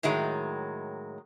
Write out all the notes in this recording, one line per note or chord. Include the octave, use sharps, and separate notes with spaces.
A2 D#3 F#3 G#3